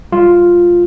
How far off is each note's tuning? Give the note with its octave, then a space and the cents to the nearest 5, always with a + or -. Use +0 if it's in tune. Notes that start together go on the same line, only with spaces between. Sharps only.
G3 +0 F4 +0